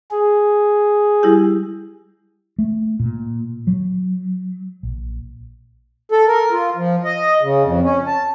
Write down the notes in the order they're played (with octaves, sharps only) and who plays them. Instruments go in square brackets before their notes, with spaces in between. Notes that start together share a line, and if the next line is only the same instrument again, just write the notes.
[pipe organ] G#4
[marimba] G3 E4 G4
[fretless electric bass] A3
A#2
F#3
A#1
[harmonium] A4
A#4
F4
F3
D#5
C#3
F2
C#4
A5